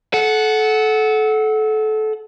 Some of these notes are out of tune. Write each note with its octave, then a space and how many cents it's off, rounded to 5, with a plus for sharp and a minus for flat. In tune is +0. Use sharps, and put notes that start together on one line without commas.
A4 -25 F#5 +0